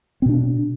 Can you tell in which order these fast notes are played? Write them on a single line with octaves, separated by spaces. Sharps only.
C4 B2 D4